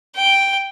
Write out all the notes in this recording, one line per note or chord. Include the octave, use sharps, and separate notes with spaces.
G5